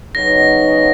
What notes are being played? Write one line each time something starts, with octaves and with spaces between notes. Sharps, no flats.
C#3 F#3 B3 D#4 A#6